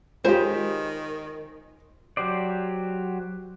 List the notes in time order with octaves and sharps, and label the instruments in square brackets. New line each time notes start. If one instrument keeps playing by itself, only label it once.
[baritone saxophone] D#3 [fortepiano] G#3 G4 [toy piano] F4 C#5 F5 [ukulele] C5
[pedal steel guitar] F#3 G4 C5 D5